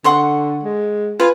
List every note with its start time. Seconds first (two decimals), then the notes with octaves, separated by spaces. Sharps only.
0.04 D3 F#5 C6 C#6
0.63 G#3
1.20 F4 B4 G#5